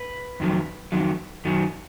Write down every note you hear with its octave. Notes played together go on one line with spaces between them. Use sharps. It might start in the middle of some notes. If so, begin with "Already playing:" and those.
Already playing: B4
F2 D#3 F#3
F2 D#3 F#3
F#2 D#3 F#3